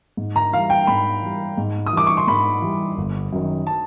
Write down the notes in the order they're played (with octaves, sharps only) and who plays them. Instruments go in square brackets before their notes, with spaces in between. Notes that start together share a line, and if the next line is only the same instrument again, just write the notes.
[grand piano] G#2
[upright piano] A#5
[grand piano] E3 [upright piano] F5
[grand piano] G3
[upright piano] G5
[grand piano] G#2 [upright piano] B5
[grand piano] E3 G3
G#2
[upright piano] D#6
[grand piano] E3 G3 [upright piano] D6
[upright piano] C#6
C6
[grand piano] G#2 [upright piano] B5
[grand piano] E3 G3
G1
F#2 D#3
[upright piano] A5